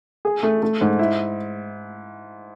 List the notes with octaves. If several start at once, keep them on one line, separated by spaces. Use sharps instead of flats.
G#4
A3
A3
G#2
E4